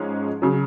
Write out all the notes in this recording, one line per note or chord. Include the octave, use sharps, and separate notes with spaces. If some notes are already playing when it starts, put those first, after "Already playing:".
Already playing: G#2 F3 G#3 C#4
C#3 F#3